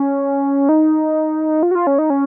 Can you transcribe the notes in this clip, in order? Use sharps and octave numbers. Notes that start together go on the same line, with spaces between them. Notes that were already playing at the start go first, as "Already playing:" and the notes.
Already playing: C#4
D#4
F4
F#4
F4
C#4
D#4
C#4